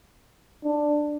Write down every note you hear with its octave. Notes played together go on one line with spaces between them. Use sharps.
D4